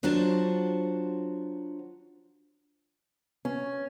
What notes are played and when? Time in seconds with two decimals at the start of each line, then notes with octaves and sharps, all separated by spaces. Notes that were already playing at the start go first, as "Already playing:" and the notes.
0.03 F#3 D4 F4 F#4 C5 A5
3.45 C#4